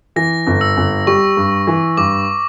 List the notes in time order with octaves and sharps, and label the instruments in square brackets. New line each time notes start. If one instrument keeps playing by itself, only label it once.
[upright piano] E3 [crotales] A#6
[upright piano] G1
[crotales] E6
[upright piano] G1
[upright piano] G3 [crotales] C#6
[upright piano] G2
E3
[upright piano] G2 [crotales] D6